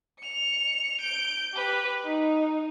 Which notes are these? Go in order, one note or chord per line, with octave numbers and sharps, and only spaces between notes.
C#7 F7
G6 D7
G4 B4
D#4